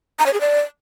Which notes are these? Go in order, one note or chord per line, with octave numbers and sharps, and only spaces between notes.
A#5
C#5
G#4
D5